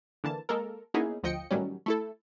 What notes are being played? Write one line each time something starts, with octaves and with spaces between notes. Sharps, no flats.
D3 E3 A#3 A5
G#3 A#3 A4 A#4
A#3 B3 C#4 D#4 E4 G#4
G1 D2 F3 D#5 G5 C#7
A2 D#3 F#3 G3 C#4
A3 E4 A4